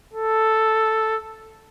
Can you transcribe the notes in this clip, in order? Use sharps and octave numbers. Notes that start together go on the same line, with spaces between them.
A4